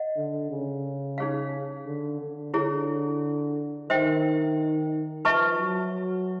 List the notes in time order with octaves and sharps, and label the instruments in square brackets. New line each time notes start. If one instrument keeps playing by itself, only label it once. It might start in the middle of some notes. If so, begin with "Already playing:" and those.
Already playing: [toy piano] D#5 F#5
[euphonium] D3
C#3
[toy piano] D#4 G#4 C#5 F5
[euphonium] D3
D3
[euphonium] D3 [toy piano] E4 G#4 C#5
[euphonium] D#3 [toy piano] C5 E5 G5
[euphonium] F3 [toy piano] B4 E5 A5 C#6
[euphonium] F#3